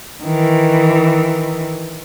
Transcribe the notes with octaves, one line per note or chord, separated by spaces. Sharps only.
D#3 E3